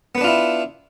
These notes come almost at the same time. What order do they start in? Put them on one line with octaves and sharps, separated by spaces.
B3 B4 D4 F4 E4